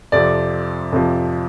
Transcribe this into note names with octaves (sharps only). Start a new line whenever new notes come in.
F2 C3 F3 D5
F2 C3 F3